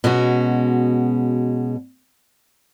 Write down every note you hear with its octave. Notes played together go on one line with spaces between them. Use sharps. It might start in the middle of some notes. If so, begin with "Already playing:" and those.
B2 G#3 C#4 F#4